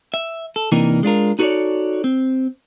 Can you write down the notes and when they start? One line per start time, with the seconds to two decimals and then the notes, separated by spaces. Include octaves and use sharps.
0.14 E5
0.56 A4
0.72 C3 E3 A#3 D4 D#4 A#4
1.03 G#3 D4 F4 A#4
1.39 D#4 F#4 A4 B4 C#5 D5
2.04 C4